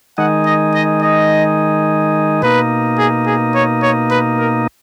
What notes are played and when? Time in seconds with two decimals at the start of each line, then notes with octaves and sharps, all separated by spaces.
0.18 D#3 G#3 D#4 F#5
0.46 D#5
0.75 D#5
1.02 D#5
2.42 B2 A#3 D#4 B4
2.99 G#4
3.27 G#4
3.55 C#5
3.83 C#5
4.10 B4
4.39 A#4